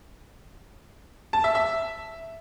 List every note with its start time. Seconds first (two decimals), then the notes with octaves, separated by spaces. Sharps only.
1.33 A5
1.44 E5
1.55 E5